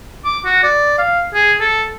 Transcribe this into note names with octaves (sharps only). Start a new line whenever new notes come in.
D6
F#4
D5
F5
G#4
A4